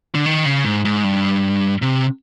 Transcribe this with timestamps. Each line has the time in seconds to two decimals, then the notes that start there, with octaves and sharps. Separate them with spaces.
0.15 D3
0.26 D#3
0.45 C#3
0.65 G#2
0.85 G#2
1.04 G2
1.82 C3